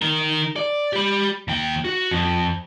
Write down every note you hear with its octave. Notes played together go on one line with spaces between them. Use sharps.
D#3 A#4
D5
G4 B5
D#2 G5
F#4
F2